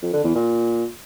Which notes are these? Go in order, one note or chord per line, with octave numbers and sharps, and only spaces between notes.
F2
D3
E2
A#2